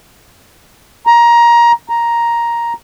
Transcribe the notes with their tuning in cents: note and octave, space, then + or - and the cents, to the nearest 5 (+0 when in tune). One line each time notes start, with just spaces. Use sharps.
A#5 +20
A#5 +5